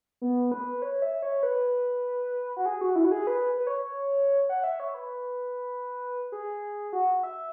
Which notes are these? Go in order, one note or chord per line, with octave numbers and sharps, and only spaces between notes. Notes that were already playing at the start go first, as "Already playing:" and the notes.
B3
B4
C#5
E5
C#5
B4
F#4
G#4
F#4
E4
F#4
G#4
B4
B4
C#5
F#5
E5
C#5
B4
G#4
F#4
E5